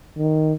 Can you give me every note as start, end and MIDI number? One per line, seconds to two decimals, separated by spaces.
0.18 0.53 51